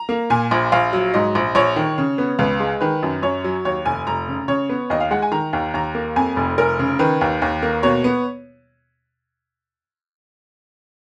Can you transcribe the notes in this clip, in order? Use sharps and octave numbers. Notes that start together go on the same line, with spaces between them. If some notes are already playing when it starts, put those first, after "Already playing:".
Already playing: A#5
A#3
A#2 G#5
A#1
A#1 F5
F#3
G#2 D#5
A#1
A#1 C#5
D#3
C#3
B3
C#2 B4
G#3
D#3 B4
F#2
F#2 C#5
F#3
D#2 C#5
F1 G#5
F1 A#5
C#3
C#3 C#5
B3
D#2 D#5
F5
G#3 F#5
G#5
D#3 A#5
D#2
D#2 A#5
A#3
F2 G#5
F1
F1 A#4
C#3
D#3 B4
D#2
D#2
A#3
B2 C#5
B3